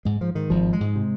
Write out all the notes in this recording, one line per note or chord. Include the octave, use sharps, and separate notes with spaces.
G#2 G#3
G#2 F3
G#2 D#3
G#1 F3
G#2
G#3
G#2
C3